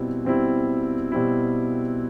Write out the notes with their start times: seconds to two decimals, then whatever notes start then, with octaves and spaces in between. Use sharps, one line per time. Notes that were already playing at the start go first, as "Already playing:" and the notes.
Already playing: B2 G3 C4 E4
0.25 B2 G3 C4 E4
1.12 B2 G3 C4 E4